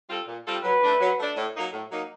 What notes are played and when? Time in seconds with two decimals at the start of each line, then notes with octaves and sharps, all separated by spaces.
0.10 G3 C4 F4 A4
0.27 A#2
0.47 G3 C4 F4 A4
0.64 F#3 B4
0.82 A3 D4
1.01 F#3
1.19 A3 D4
1.36 A2
1.56 F#3 A#3 D#4
1.73 A2
1.92 F#3 A#3 D#4